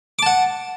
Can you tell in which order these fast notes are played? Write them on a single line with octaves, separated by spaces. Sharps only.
D6 A5 F#5